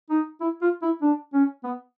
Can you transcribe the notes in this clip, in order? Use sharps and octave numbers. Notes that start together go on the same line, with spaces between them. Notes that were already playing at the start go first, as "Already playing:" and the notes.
D#4
E4
F4
E4
D4
C#4
B3